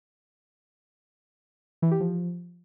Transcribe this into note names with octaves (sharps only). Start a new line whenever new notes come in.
E3
G4
F3